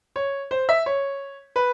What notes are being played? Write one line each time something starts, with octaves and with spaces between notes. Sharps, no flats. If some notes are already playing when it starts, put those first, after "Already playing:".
C#5
C5
E5
C#5
B4